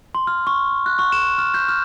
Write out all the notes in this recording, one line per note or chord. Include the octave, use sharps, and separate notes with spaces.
C6
F6
C#6
F#6
C#6
E7
F6
G6
F6